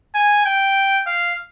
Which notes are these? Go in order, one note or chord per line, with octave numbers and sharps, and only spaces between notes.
G#5
G5
F5